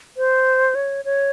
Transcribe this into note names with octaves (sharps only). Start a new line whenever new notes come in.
C5
C#5
C#5